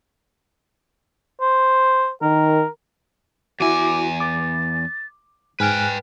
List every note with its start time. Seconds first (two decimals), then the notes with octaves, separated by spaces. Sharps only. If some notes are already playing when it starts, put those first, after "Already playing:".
1.41 C5
2.22 D#3 A#4
3.60 E2 E4 F#4 G#5 D6
4.20 D6 A6
5.60 G#2 B4 G5 G#5 F6 F#6